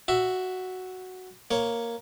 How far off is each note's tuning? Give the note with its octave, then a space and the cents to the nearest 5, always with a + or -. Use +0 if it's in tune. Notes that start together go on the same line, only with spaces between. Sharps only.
F#4 +0 E5 +0
A#3 +0 C#5 +0